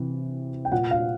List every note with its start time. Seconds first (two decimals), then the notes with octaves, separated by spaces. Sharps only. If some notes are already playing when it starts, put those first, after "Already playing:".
Already playing: C3 E3
0.65 G5
0.72 A#2 F#5
0.91 F5